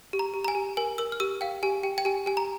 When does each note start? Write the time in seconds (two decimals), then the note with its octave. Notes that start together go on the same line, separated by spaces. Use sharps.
0.13 G4
0.19 A#5
0.34 G4
0.45 A#5
0.48 G#5
0.55 G4
0.77 A#4 G#5
0.98 A#4 E6
1.12 F6
1.20 G4 E6
1.41 F5 G5
1.63 G4 G#5
1.83 G4 G5
1.98 G5
2.05 G4 G#5
2.26 G4 G#5
2.37 A#5